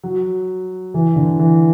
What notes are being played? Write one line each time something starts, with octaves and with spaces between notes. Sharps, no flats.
F#3
E3
D3
E3